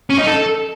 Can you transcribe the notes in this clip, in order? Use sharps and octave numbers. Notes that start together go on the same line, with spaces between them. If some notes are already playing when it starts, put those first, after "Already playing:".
C#4
D#4
A4